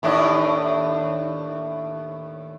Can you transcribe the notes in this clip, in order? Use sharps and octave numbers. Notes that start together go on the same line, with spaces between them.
D#2 A2 D4